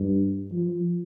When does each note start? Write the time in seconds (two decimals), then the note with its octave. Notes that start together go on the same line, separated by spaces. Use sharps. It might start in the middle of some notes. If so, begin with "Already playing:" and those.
Already playing: G2
0.53 F3